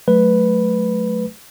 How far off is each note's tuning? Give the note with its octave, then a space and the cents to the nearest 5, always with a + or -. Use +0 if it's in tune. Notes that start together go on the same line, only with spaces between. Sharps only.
F#3 +0 A3 -15 B4 +0